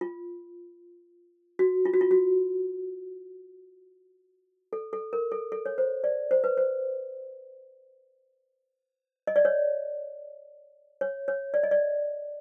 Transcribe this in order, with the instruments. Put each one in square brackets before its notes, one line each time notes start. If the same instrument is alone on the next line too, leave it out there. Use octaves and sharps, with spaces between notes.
[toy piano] F4
F#4
F4
F#4
F4
F#4
A4
A4
A#4
A4
A4
C#5
C5
D5
C5
B4
C5
D#5
D5
C#5
C#5
C#5
D5
D#5
D5